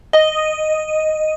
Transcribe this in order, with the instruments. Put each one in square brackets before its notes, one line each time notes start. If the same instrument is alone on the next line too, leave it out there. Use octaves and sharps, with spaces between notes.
[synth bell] D#5